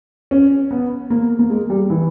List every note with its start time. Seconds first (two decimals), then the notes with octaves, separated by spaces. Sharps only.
0.31 C#4
0.71 B3
1.10 A#3
1.39 A#3
1.50 G#3
1.70 G3
1.90 E3